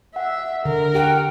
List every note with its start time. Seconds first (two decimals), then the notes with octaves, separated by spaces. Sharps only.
0.16 E5 F#5
0.65 D3 A#4
0.94 G4 F#5 G5